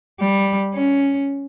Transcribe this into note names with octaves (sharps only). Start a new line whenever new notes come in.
G3
C#4